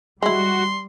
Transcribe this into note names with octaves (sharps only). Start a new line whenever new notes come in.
G3 G#3 E4 F#4 C6